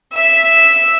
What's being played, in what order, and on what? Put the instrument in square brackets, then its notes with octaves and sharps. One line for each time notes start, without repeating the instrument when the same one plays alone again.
[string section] E5